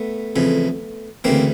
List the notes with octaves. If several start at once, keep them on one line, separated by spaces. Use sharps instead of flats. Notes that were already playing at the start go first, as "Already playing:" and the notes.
Already playing: A3 B3
F2 C#3 E3
D2 C#3 E3 A#3 C4